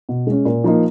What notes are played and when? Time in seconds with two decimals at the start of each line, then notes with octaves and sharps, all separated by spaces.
0.09 B2
0.27 G#3 C#4
0.45 A#2
0.64 F3 A#3 D#4